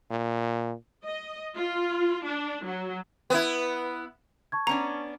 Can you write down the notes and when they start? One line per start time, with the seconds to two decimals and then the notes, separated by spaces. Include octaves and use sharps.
0.11 A#2
1.06 D#5
1.56 F4
2.24 D4
2.64 F#3
3.30 B3 E4
4.52 A5 C#6 G#6
4.67 B3 C#4 D4 A#5